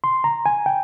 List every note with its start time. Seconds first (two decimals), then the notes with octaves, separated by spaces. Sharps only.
0.04 C6
0.24 A#5
0.46 G#5
0.66 G5